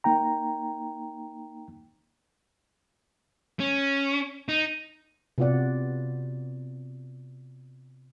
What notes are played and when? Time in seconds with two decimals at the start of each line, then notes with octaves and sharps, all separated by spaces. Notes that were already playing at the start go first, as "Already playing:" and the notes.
0.04 A#3 D#4 G5 A#5
3.60 C#4
4.49 D#4
5.38 C3 B3 F4 F#4 D5 F#5